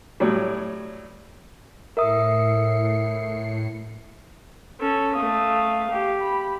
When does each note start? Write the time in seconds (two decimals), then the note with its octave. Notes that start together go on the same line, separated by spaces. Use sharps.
0.20 A2 F#3 G3
1.97 A2 A#4 E5 D#6 C7 C#7
4.80 C#4 A4
5.15 A3 F5 D#6
5.91 G4
6.21 B5